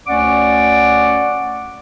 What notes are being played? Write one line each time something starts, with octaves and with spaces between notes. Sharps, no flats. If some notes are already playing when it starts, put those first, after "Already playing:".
D2 C#4 D5 F#5 D6